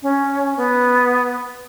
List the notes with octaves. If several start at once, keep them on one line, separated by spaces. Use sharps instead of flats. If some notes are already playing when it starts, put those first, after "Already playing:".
C#4
B3